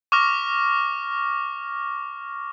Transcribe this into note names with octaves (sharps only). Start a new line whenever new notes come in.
C#6 D6 F6 A#6